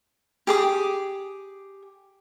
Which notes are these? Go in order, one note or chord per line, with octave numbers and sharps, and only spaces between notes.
G4 G#4 D6